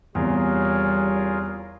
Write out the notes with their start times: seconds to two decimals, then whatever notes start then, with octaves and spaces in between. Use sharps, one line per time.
0.15 E2 C3 G3 F4 G#4 A#4 C#5